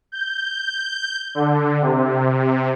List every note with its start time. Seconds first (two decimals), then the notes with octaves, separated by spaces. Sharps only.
0.12 G6
1.35 D3
1.81 C3